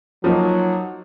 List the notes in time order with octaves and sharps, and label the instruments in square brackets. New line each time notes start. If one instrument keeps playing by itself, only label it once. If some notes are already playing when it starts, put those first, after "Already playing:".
[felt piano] F3 A#3 D#4 [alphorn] F#3